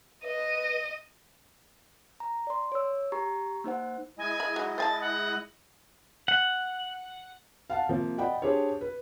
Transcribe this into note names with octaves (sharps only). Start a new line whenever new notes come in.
B4 D#5
A#5
D5 C6
C#5 E6
G4 A#5 C#6
A#3 D#4 C5 F#5
G#3 E4 D#5 G#5
B5
F#3 D#4
C5 G#5 A5 A6
F#5
F#5
F5 F#5 A5
C3 F3 A#3
D5 D#5 F#5 G5 B5
D4 G4 G#4 C5 C#5
B4